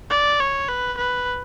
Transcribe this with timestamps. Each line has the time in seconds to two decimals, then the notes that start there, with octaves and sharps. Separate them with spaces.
0.10 D5
0.40 C#5
0.69 B4
0.98 B4